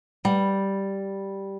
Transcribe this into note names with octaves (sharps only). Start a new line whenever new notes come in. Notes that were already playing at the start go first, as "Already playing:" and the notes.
G3